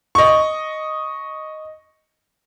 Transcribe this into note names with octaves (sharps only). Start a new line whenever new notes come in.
D#5 C#6